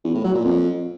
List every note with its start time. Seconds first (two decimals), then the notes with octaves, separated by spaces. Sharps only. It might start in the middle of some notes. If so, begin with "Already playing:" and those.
0.04 E2
0.14 A2
0.24 F#3
0.34 A#2
0.44 F2